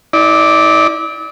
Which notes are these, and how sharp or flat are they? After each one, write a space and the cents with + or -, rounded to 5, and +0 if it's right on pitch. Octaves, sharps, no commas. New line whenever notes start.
E4 -45 D5 +0